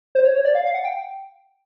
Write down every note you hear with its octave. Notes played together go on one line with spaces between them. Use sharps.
C5
C#5
C#5
D5
F5
F5
F#5
G5